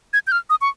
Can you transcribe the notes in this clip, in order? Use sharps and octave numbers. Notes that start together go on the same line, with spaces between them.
G#6
G6
F6
D#6
C#6